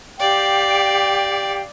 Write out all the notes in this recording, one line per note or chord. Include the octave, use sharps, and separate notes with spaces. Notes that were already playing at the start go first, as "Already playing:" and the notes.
G4 D5 F5 G5